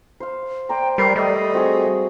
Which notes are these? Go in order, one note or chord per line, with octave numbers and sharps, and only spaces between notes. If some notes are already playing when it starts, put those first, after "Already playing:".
C5 F5
C5 D5 G5 A#5
G3 A#4 B4 C7
G3 A3 D#5
C4 F#4 G#4